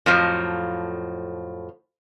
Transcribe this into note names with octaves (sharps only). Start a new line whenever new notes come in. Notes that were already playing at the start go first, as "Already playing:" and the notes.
F2 A2 F3 F#3